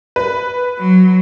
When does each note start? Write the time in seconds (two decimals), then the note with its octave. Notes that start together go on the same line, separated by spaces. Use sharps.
0.16 B4
0.79 F#3